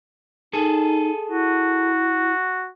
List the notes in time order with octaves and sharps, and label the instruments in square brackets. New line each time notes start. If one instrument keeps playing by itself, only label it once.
[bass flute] D#4 [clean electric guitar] G#4 A4
[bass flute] E4 [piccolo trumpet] F#4